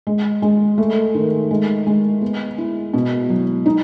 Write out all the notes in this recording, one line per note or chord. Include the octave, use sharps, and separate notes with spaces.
G#3
G#3
A3
D#3
G#3
G#3
B3
E4
B2
F#3
D#4